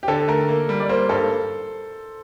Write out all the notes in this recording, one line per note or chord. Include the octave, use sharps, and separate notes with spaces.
G4
D3 A4
A3 A#4
A#3
G3
D5
A#3 C5
G2 A4